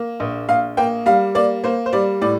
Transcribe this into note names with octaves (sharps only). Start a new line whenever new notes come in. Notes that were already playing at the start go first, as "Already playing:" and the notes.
Already playing: A#3
A#1
A#1 F5
A#3 G5
G3 F5
A#3 D5
A#3 C5
C5
G3 D5
A2 D5